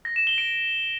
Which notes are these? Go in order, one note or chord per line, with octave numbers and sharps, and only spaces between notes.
A#6
E7
G7
D7